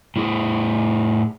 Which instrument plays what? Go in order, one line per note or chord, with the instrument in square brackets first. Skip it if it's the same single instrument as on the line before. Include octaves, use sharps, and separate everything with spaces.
[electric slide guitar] A2 E4 G#4